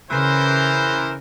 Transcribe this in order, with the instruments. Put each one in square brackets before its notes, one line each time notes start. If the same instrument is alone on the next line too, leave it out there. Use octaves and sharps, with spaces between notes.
[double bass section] C#3 [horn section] E3 A#4 C5